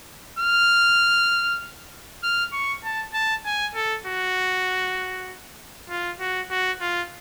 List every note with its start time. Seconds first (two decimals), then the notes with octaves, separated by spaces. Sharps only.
0.39 F6
2.23 F6
2.53 C#6
2.84 A5
3.14 A5
3.45 G#5
3.75 A4
4.06 F#4
5.90 F4
6.20 F#4
6.50 F#4
6.81 F4